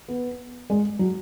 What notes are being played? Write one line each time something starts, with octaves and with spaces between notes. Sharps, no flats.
B3
G#3
F#3